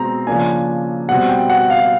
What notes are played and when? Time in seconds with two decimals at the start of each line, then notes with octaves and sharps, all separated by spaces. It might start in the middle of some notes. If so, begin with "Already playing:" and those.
Already playing: B2 G#3 C4 A#5
0.27 C#3 F3 A#3 D4 G#5
1.09 B2 G3 C4 F#5
1.29 G5
1.50 F#5
1.70 F5